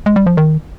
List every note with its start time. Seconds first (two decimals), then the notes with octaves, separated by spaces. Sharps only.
0.06 G#3
0.16 G3
0.26 F3
0.37 D#3